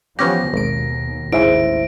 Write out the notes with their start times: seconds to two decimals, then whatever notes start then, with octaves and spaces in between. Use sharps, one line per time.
0.19 E3 F3 B3 C#4 G4 A#6
0.53 G#1 D#2 B2 D7
1.32 A1 D#2 G#2 C#3 E4 C5 E5 D7